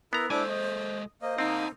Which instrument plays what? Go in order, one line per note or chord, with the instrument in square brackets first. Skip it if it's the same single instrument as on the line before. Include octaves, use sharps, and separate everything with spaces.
[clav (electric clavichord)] B3 A#5 [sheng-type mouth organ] E4 A#4 [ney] B4
[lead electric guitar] G#3 A4 [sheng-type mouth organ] D4 E4 D6 [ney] C5 [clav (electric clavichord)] G#5
[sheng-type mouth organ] D#5
[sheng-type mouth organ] A#3 D#5 [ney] C5
[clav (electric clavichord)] C4 [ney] D#4 [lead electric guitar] F#5 A5